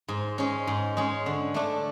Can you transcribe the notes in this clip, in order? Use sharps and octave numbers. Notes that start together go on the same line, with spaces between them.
G#2
G#3 C#4
G#2
G#3 C#4
D3
A3 D4 A4